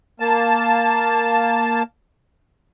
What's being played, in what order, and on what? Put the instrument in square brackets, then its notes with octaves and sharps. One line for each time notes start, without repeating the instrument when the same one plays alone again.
[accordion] A#3 A5